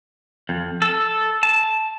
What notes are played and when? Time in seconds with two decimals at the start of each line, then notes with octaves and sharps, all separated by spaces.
0.49 F2
0.82 A4
1.43 A5